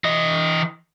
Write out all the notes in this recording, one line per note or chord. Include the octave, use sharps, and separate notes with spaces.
E3 D#5